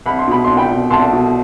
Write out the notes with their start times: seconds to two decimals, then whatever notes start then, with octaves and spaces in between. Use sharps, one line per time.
0.06 C2 B5
0.19 C6
0.28 B2 B5
0.44 C2 C6
0.57 G5 B5
0.70 B2
0.90 C2 A5 C6
1.12 B2